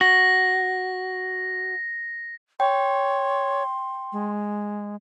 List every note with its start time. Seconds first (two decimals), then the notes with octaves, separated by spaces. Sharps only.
0.01 F#4 A#6
2.60 C#5 G5 C6
4.12 G#3